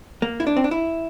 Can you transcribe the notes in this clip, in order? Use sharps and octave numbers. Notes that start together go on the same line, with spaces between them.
A#3
E4
D4
C4
D4
E4